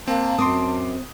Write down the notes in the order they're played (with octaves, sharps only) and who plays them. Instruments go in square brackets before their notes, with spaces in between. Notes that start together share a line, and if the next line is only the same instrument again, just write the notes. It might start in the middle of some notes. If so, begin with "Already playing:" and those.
[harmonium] A#3 [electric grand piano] C4 [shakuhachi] A5
[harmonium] F#2 [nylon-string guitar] C4 [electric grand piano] C6 D6 D#6